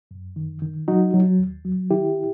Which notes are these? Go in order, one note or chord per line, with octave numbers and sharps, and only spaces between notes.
F#2
D#3
D#3
F#3 D#4 F#4
F#3
D#2
F#3
D#3 E4 G4